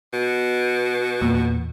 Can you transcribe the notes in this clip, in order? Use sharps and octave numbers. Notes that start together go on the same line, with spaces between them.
B2
E2 A#2